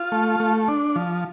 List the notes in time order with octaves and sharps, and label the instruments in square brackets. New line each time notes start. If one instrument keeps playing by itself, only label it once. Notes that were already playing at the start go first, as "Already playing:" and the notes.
Already playing: [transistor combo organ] F4
A3
A3
D4
F3